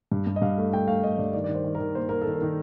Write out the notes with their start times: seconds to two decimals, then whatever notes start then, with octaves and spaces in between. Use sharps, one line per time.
0.12 G2
0.27 G2
0.36 D#5
0.42 G2 F5
0.58 A3
0.73 A3 G5
0.88 A3 F5
1.03 A3 D#5
1.18 G2 D5
1.33 D#3 D5
1.44 D#3 D5
1.54 C5
1.64 D#3
1.75 D#3 A#4
1.95 A#3 C5
2.09 A#3 A#4
2.22 D#3 A4
2.35 A#4
2.42 D#3